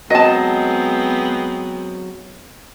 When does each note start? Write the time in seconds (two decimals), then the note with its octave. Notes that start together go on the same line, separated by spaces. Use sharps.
0.10 F#3 G#3 B3 C4 D#5 A5